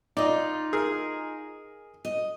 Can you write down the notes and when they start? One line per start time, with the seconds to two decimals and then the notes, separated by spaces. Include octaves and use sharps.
0.17 D#4 F4 D5 D#5
0.73 G#4 A#4
2.05 D#5